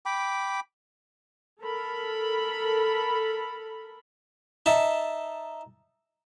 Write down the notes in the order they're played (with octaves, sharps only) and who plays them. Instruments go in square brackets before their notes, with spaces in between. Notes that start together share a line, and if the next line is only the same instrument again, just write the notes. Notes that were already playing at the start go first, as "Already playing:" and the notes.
[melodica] G5 B5 D6
[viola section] A4 A#4 B5
[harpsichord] D#4 E5 A5